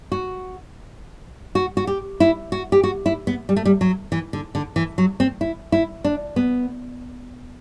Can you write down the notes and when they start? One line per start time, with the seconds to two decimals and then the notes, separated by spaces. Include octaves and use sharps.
0.12 F#4
1.55 F#4
1.77 F#4
1.87 G4
2.20 E4
2.52 F#4
2.72 G4
2.83 F#4
3.06 E4
3.27 B3
3.49 G3
3.56 A3
3.66 G3
3.81 F#3
4.12 E3
4.33 D3
4.55 D3
4.76 E3
4.98 F#3
5.20 C4
5.41 E4
5.72 E4
6.04 D4
6.36 B3